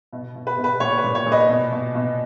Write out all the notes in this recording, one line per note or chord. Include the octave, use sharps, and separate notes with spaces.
B2
B2
B4
B2
B4
A#2 C#5
B4
A#2
C#5
A#2
B4 D#5
B2
B2
B2